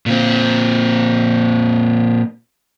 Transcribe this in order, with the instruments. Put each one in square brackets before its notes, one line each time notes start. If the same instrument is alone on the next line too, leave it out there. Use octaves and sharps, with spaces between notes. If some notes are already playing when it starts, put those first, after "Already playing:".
[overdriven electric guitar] A#2 C4